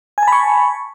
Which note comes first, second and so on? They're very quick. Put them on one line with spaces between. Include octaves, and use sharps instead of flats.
G#5 A5 B5 C#6